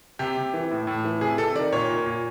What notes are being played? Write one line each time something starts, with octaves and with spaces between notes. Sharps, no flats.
C3 G4
C3
E3
A2
A2
E3
C3 G#4
C3 A4
D#3 D5
A#2 C#5
A#2
A#2